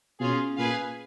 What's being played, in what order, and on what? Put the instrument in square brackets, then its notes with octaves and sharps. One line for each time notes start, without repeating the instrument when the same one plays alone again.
[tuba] B2 [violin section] C#4 F4 G#4
[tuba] A#2 [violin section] G#4 B4 F5 G#5